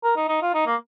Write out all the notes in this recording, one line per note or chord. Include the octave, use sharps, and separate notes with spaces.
A#4
D#4
D#4
F4
D#4
A#3